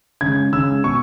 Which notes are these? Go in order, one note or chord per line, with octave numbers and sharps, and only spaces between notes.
C#3 G#3 G#6
C#3 G#3 E6
B2 C#6